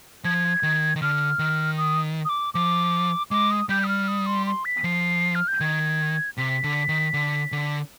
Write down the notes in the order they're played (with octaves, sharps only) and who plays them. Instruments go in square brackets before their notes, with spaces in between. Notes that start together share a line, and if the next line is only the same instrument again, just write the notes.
[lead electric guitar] F3 [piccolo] G#6
[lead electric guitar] D#3
D#3
[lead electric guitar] D3 [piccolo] F6
[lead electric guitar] D#3
[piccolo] D#6
D#6
D6
[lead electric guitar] F3 [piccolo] D6
[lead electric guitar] G#3 [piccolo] D6
[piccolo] D#6
[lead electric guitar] G3 [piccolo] G6
[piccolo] D#6
F6
D#6
C6
C6
B6
[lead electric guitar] F3 [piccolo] C7
[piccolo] F6
G6
[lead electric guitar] D#3 [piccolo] G#6
[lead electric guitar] C3 [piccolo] B6
[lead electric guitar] D3
D#3
D3
D3